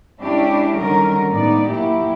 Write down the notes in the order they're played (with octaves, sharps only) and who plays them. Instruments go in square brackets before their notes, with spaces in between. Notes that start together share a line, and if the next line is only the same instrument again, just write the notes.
[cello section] G#3 C#4 D4 E4 G4
D3 D#3 F#3 G3 C#4 A#4
A2 G#3 B3 D#4 D5
A#2 F#3 A#3 E4 G4